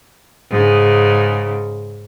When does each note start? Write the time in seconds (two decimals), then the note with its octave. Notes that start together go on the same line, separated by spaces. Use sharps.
0.51 G#2 C#3